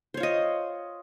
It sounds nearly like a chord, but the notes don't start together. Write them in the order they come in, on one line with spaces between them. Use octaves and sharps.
C5 C#5 F4 D#5